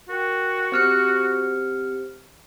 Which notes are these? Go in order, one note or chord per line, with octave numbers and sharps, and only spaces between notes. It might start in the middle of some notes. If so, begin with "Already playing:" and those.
F#4 A#4 G5
C4 G4 C5 F6 C#7